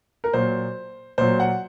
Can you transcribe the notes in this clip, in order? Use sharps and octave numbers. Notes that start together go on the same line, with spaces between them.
A#4
A#2 F#3 C5
A#2 F#3 C5
F#5